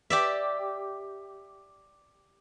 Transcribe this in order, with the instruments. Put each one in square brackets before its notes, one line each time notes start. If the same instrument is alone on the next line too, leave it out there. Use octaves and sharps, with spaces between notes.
[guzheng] G4 D5 E5